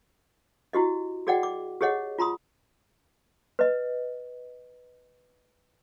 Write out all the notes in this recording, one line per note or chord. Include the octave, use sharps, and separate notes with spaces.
E4 F#4 G4 D#5
F#4 G#4 D5 D#5 F#5 G5
D6
G4 G#4 C#5 D#5 F#5
F4 A#5 C6 D#6
B4 D#5